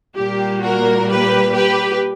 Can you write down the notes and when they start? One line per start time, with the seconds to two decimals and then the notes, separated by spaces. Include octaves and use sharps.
0.18 A#2 G3 A#3 G4
0.63 F#4 A#4
1.09 G4 B4
1.54 G4 B4